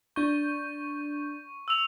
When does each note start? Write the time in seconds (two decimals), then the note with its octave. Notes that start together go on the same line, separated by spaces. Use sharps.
0.16 D4 C#6 G6
1.68 E6 F7